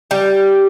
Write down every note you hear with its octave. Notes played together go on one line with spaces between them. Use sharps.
G3